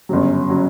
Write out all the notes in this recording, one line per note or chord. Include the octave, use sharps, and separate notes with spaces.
G1 F#2 C#3 F#3
C#3 F#3